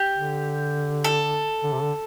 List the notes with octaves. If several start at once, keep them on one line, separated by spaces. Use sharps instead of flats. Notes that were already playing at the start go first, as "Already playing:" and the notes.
Already playing: G4
D3
A4
D3
C3
D3